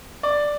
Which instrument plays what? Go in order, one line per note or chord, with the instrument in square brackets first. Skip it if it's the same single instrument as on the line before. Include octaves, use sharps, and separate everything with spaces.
[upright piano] D5